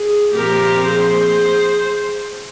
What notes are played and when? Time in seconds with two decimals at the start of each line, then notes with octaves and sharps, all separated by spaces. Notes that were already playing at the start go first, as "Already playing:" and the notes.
Already playing: G#4
0.33 A#2 F3 C4 G4 A#4
0.85 G#4 C5